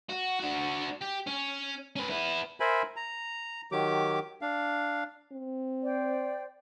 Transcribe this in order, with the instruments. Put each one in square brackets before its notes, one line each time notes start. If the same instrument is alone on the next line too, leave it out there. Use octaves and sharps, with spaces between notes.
[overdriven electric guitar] F#4
D4 F#4
G4
C#4
C#4 B4
B3 E4
[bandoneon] A#4 C5 E5 G#5 B5
A#5
D#3 F#3 G4 D6
D4 F5
[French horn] C4
[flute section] C5 D5 G5